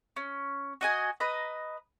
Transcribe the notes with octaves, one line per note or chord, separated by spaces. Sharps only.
C#4
F#4 D#5 G#5
B4 D#5 A#5